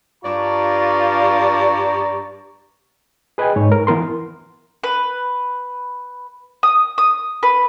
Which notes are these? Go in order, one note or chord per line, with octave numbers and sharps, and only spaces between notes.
G2 F4 D5 A#5 C#6
G#4 B4 D#5 G5 G#5
G#2 C#5
A#4
E3 B3 A#4 C6
B4
D#6
D#6
B4